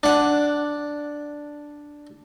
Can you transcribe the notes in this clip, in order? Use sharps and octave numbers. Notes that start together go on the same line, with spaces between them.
D4 F#5